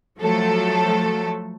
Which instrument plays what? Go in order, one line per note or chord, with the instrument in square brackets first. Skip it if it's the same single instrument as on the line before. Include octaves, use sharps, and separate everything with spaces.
[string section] F3 F#3 A3 A4